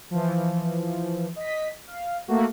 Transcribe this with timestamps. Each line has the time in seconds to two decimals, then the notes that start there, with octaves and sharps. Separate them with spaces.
0.11 E3 F3
1.36 D#5 B6
1.87 F5
2.28 A3 A#3 F#4